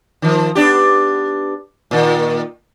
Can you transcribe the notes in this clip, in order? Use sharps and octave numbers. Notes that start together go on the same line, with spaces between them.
D#3 F3
B3 D4 G4
A#2 D#3